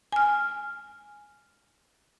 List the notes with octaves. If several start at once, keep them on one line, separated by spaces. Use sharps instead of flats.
G#5 F6